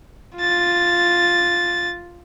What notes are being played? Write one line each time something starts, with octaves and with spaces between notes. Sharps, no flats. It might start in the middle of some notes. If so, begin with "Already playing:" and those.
F4 A6